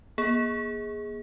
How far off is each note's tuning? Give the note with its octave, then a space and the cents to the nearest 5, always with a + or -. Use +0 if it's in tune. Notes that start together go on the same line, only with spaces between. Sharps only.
A#3 +45 G#4 +0